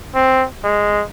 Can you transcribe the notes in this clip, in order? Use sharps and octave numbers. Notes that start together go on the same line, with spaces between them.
C4
G#3